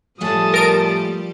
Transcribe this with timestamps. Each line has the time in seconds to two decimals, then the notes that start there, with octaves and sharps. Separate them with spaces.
0.21 A2 F3 G3 A3 G4 G#4 A5 D#6
0.54 A#4 D7